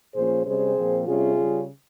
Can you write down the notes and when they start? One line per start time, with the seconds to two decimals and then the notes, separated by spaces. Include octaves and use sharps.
0.14 A#2 F3 A#3 C#4 G#4 C5
0.45 C3 G3 C#4 G#4 C5
0.76 A#2 F3 C4
1.06 C3 G3 C#4 F4 G#4
1.36 C#3 G3 C#4